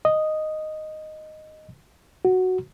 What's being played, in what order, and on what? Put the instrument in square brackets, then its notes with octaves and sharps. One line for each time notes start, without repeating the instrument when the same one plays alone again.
[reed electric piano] D#5
F#4